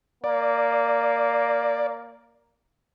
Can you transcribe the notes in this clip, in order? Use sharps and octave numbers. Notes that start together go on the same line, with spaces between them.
A#3 D5